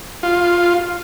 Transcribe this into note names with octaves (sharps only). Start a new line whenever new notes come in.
F4